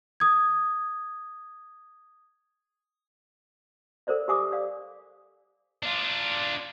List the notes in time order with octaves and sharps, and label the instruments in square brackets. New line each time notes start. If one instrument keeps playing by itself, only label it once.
[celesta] D#6 G#6
[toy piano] A4 A#4 C5 D5 E5
G4 A#4 E5 G#5 D6 D#6
D5 F5
[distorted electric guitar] D4 F4